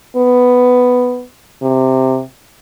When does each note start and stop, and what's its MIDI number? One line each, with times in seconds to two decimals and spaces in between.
0.17 1.23 59
1.62 2.21 48